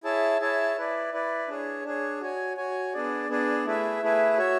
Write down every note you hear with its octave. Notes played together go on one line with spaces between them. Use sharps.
E4 G#4 C#5 E5 A5
E4 G#4 C#5 E5 A5
E4 B4 D5
E4 B4 D5
D4 G#4 C#5
D4 G#4 C#5
F#4 C#5 G#5
F#4 C#5 G#5
B3 D4 G#4 D5
B3 D4 G#4 D5
A3 E4 G#4 B4 E5
A3 E4 G#4 B4 E5
F#4 C#5 E5